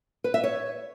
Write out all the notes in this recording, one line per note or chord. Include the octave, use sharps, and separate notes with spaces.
B4
E5
C#5